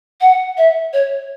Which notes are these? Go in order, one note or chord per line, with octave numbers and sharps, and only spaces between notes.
F#5
E5
C#5